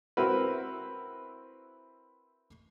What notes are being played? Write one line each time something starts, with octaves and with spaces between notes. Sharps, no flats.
C4 E4 F#4 A#4 B4